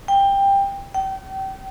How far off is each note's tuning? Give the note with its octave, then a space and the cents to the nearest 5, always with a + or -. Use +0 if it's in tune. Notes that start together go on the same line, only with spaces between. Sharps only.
G5 +15
G5 -30